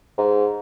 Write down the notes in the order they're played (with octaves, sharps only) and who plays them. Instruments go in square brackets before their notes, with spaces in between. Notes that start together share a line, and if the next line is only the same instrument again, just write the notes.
[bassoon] G#2